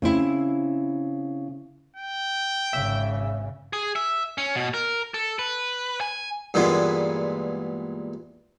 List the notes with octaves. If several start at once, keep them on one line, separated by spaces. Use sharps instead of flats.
C#3 C4 E4
G5
G#1 C#3 E5
G#4
E5
C#4
B2
A#4
A4
B4
G#5
G2 A#2 E3 G#3 B3